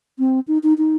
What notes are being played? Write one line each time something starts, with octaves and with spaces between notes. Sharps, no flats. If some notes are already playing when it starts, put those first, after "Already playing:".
C4
D#4
D#4
D#4